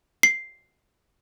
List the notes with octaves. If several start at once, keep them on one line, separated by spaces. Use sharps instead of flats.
C7